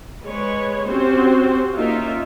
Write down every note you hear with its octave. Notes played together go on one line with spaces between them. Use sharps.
G#3 B4 C#5
C4 C#4 F#4 G4 C5
A#3 C#4 D#4 F4 A#4 E5